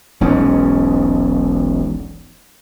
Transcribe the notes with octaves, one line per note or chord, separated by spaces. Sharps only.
E1 B1 G#2 C#4